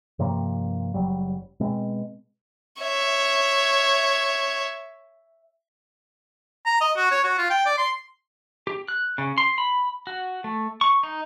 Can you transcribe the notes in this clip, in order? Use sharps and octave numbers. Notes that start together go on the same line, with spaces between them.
G2 C3 F3 A#3
F#1 D#2 F#3 G3
B2 G#3 C4
C#5 E5
A#5
D#5
F#4
C#5
F#4
F4
G5
D5
C6
G4
F#6
C#3
C6
B5
F#4
A3
C#6
D#4